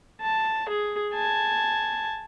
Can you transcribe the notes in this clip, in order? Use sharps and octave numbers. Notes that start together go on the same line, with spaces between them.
A5
G#4
G#5 A5